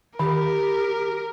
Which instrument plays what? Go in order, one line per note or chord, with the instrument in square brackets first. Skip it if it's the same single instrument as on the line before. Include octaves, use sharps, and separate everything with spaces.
[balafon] D#3 [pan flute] G4 [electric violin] A#4